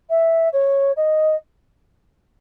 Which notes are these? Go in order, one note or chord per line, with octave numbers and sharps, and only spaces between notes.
E5
C#5
D#5